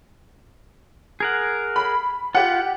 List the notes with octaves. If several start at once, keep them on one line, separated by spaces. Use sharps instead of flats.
G#4 A#4 F#5
B5
F4 G4 F#5